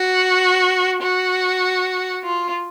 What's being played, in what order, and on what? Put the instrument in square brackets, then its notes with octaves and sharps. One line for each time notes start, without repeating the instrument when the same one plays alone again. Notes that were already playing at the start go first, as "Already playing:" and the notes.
Already playing: [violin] F#4
F#4
F4